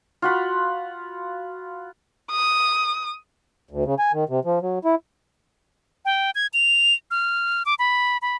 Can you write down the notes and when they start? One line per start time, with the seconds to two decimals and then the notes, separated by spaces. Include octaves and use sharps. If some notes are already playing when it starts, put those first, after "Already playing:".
0.22 F4 F#4 B5
2.31 D#6
3.71 D2
3.85 C#3
3.99 G#5
4.13 D#3
4.29 C3
4.45 F3
4.62 F#3
4.85 E4
6.05 G5
6.35 G#6
6.54 F7
7.11 F6
7.66 D6
7.79 B5
8.22 B5